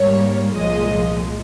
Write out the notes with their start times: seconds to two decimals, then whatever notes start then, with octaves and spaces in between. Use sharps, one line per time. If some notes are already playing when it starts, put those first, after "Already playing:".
Already playing: G#1 G#2 G3 A#3 C#5
0.56 C2 A#2 F3 G#3 D#5